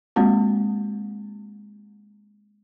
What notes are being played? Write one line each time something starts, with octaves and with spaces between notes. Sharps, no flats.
G#3 A#3 C4 F#4